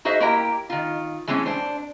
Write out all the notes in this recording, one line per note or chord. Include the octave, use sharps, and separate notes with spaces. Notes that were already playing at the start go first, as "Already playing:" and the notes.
D#4 F#4 G#4 C5 D#5 E5
A#3 E4 G4 A#4 G5 A#5
D#3 F4
E3 G#3 A3 C4 C#4
D4 C5